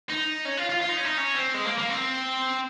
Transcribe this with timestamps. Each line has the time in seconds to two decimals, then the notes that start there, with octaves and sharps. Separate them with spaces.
0.09 D#4
0.45 C#4
0.57 F4
0.69 F4
0.82 F4
0.89 D#4
0.97 C#4
1.05 D#4
1.18 C#4
1.35 C4
1.54 G#3
1.66 A#3
1.78 A#3
1.90 C4